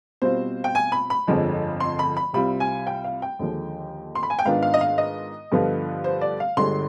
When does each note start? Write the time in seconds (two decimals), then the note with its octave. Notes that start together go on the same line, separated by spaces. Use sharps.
0.22 B2 G3 C4 F4 C5
0.64 G5
0.75 G#5
0.92 B5
1.10 B5
1.27 G1 F2 D3 F3 G#3
1.80 C6
1.99 B5
2.17 B5
2.33 C2 C3 G3 C4 F4 B5
2.60 G#5
2.87 G5
3.04 F5
3.22 G5
3.39 D#2 D3 F3 G#3
4.15 C6
4.23 B5
4.30 G#5
4.39 G5
4.45 G#2 D#3 B3 D4 F4 F5
4.62 F5
4.74 D#5
4.81 F5
4.98 D#5
5.52 G2 D3 F3 B3 F4
6.04 C5
6.21 D5
6.40 F5
6.57 G1 G2 D3 G#3 C6